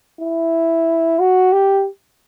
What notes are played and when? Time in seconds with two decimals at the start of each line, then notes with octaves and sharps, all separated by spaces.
0.21 E4
1.19 F#4
1.52 G4